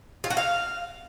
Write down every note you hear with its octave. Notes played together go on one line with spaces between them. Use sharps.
F4
F#4
F5